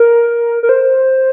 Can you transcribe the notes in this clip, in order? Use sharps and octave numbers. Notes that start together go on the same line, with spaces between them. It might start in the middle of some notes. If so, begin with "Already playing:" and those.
Already playing: A#4
A#4
C5